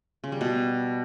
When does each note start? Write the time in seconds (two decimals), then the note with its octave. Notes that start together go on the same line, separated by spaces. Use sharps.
0.24 C#3
0.32 G3
0.41 B2